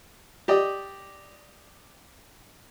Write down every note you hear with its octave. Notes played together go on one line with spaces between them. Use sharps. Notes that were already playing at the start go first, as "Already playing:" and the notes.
G4 D5 D#5